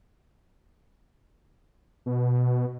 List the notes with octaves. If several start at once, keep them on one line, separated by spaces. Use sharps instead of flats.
B2